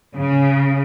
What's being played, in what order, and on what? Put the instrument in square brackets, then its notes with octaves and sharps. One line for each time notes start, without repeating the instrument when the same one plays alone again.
[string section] C#3